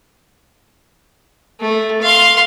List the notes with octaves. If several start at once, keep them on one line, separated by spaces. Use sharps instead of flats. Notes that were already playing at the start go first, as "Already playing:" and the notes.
A3
F5 C6